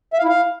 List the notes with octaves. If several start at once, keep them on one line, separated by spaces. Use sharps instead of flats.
E5
F5
E4
F5